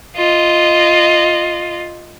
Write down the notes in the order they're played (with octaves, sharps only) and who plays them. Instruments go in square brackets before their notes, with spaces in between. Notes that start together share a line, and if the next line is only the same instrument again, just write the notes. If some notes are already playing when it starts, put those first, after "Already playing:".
[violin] F4 D#5